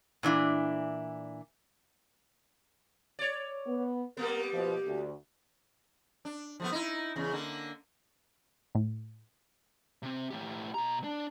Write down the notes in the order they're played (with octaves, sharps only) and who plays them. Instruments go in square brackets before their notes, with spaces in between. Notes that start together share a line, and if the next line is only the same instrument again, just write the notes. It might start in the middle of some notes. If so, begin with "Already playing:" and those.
[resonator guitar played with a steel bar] A#2 E3 D4 E4
[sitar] C#5 D5
[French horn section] B3
[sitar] G3 A#3 B3 [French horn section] A#4
[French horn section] B2 F3
D2
[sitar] D4
F3 A3 B3
D#4 E4
E2 C#3
D3 A#3
[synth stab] A2
[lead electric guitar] C3 C4
A2 G4
B2 A#5
D4